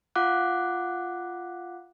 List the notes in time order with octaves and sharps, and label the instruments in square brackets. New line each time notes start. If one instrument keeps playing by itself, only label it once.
[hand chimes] F4 F5 F#5 D6 F#6